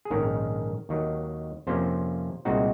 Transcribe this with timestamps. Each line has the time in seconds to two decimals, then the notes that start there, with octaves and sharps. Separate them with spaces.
0.05 G#4
0.10 A#1 G#2 D#3 G#3 C#4 A#4
0.89 D#2 D#3 F#3
1.67 F2 C3 F3 A#3 C#4 C5
2.45 C2 A#2 G#3 C4 D#4 F#4